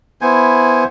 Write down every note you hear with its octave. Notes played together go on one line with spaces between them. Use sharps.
B3 E4 C5 G#5